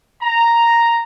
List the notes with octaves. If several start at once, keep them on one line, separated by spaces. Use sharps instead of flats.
A#5